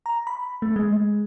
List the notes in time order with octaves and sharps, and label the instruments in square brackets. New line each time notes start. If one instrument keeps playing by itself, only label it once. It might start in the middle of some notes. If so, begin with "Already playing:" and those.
[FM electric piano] A#5
B5
A3
G#3